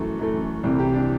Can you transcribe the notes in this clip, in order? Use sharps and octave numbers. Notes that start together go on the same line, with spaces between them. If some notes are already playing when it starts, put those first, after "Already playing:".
Already playing: F#2 E3 A3 F#4
F#2 E3 A3
C2 C3 E3 G3
G4
D4